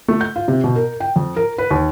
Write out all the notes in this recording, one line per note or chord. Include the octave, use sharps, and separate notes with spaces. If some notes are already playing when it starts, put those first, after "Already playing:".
A3
G6
F4
C3
B2
A#4
G5
F2
A#4
B4
D#2